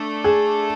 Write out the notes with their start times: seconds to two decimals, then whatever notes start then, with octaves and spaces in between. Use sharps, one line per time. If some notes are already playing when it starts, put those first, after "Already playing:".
Already playing: A3 D4 A4
0.24 G#4